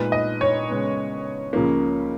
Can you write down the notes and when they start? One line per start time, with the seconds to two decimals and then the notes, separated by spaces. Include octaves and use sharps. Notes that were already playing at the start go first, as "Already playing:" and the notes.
Already playing: A#2 G#3 B3 D#4 B4
0.12 D#5
0.41 C#5
0.70 C#3 G#3 B3
1.53 C#2 C#3 F3 A#3